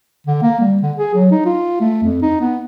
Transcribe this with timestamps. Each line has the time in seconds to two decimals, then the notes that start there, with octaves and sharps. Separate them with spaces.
0.27 D3
0.42 A#3
0.60 G3
0.82 D3
0.98 G#4
1.15 F#3
1.31 D#4
1.46 F4
1.81 A3
2.03 F2
2.22 D#4
2.41 B3